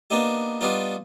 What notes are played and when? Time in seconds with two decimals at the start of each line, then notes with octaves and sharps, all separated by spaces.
0.10 A#3 B3 D4 D#4 G4
0.61 G3 B3 D4 D#4 F4